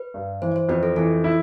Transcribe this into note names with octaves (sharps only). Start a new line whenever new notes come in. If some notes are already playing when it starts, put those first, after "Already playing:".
Already playing: B4
G2
E3 C5
C5
F2 B4
A4
E3 A4
E4